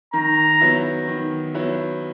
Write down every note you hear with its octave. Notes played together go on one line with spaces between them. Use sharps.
D#3 A#5
F#3 B3 E4
D#3
F#3 B3 E4